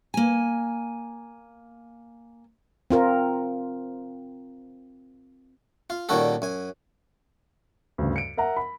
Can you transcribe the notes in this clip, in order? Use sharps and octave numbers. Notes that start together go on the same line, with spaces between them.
A#3 G#5
C4 F4 A#4
F4
A#2 D#3 G3 C#4 F#4 A4
F#2 G#5
D2 G2 C#3
C#7 D7
A#4 E5 F#5 A#5
B5